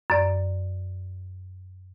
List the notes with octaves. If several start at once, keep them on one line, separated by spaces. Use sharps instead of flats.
F#2 D5